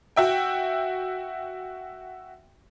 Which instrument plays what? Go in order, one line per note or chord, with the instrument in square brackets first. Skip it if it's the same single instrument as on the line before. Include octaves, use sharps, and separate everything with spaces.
[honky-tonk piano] F#4 E5 G5